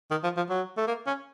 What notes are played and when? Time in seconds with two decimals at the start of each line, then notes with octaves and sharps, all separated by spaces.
0.11 D#3
0.24 F3
0.37 F3
0.49 F#3
0.77 A3
0.87 A#3
1.07 C#4